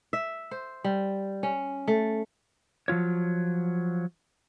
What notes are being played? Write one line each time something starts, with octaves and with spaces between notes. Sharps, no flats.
E5
C5
G3
C#4
A3
F3 F#3 F4 C#5